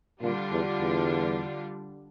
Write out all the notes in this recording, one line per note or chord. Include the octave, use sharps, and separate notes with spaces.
A#2 D3 G3 D4 F4
E2
E2